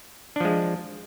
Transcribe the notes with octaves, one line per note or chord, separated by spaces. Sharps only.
F3 G#3 D4